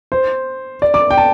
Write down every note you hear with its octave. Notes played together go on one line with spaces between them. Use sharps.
C5
D5
D6
G5
A5